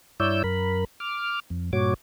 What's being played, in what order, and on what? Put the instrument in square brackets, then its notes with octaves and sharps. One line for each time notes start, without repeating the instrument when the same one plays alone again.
[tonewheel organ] G2 E4 C#5 D5 E6 G6
F#2 A#4 B5
D6 F6
F2
G2 A#2 F#4 C#5 D6